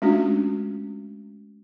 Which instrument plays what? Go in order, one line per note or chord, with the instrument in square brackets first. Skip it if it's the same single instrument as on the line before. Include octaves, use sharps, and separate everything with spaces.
[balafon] G#3 A3 C#4 D4 F4 F#4